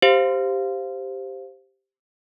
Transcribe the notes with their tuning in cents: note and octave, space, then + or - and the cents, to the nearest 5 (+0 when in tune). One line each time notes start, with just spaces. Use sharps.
G4 +0 C5 +0 F5 +0